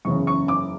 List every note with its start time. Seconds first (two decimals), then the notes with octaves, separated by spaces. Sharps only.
0.05 F#1 E2 C#3 C#6
0.27 C#6
0.48 D6